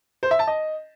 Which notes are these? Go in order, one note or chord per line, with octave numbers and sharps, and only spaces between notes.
C5
E5
A5
D#5